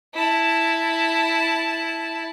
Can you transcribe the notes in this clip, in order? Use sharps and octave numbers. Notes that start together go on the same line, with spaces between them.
E4 A5